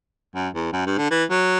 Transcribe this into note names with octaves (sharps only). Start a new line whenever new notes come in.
F#2
E2
F#2
G2
D3
E3
F#3